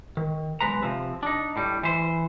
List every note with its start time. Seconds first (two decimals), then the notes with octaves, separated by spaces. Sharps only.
0.17 D#3
0.61 B1 F#2 G#3 B4 A#5
0.83 C3 F3 C4
1.23 D4 D#4
1.56 A2 G3
1.83 E3 C5